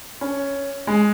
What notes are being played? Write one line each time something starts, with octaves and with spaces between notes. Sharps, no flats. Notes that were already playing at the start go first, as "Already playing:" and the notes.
C#4
G#3